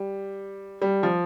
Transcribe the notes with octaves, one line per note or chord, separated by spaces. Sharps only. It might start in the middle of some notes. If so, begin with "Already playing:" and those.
Already playing: G3
G3
F3